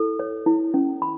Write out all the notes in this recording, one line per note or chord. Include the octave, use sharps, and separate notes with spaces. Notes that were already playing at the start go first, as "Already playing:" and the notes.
Already playing: E4 A4
C#5
E4
C#4
B5